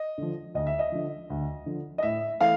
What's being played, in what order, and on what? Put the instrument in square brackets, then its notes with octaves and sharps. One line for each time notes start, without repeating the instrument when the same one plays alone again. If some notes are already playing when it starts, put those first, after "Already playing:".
Already playing: [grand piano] D#5
D3 F3
D2 D#5
E5
D#5
D3 F3
D2
D3 F3
D#5
A2 E5
E3 A3 F5